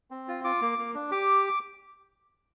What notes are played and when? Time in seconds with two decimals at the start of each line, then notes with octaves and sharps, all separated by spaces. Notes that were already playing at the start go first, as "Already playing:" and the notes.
0.11 C4
0.28 F4
0.44 F4 D6
0.62 A#3
0.79 A#3
0.94 D4
1.11 G4 D6